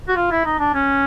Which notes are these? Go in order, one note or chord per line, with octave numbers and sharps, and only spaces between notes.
F#4
F4
E4
D#4
D4
C#4